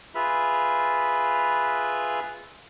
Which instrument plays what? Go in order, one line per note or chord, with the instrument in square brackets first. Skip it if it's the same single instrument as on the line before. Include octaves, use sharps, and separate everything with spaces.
[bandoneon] F4 G#4 B4 E5 B5 F6